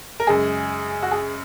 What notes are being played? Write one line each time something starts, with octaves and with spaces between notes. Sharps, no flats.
A#4
F#2 C#3 G#3 G#4
F#4
G#4